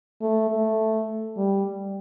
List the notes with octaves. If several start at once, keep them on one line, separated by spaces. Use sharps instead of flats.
A3
A3
G3